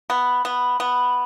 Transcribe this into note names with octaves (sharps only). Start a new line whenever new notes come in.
B3
B3
B3